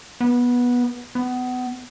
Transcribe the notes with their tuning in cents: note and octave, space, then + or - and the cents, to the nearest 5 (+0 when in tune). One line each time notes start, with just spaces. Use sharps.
B3 -15
B3 +25